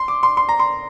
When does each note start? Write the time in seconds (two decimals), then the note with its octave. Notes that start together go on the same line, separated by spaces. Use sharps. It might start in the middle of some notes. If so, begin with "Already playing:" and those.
Already playing: C6
0.08 D6
0.23 C6
0.37 C6
0.49 A#5
0.60 C6